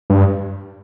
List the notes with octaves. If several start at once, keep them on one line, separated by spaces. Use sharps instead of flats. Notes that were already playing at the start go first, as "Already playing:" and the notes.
G2